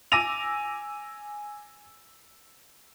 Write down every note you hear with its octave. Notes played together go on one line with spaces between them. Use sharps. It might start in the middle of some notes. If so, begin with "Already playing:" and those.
G#5 D6 E6 A#6 D#7 F7